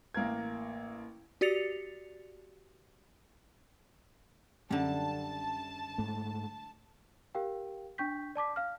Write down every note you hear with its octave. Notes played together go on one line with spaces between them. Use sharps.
A1 A#3 A#4 G#6
F#4 G4 D5 A6 C#7 F7
F#2 D3 G3 A5
G#2 A3
G4 A#4 F5 G5
D4 G5 C#6 G6 B6
D5 A5 D6 B6
F5 F6